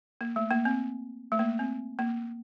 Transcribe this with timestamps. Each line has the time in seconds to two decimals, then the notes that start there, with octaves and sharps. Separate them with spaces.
0.21 A#3
0.36 A3
0.51 A#3
0.65 C4
1.32 A3
1.39 A#3
1.59 C4
1.99 A#3